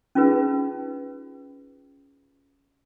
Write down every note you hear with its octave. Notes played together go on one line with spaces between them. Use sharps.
C#4 D#4 F4 G#4 B4